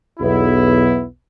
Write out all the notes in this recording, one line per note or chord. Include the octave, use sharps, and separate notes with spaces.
B1 E2 B3 E4